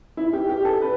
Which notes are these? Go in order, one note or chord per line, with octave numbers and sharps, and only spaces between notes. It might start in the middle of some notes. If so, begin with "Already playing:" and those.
E4
G4
G4
A4
B4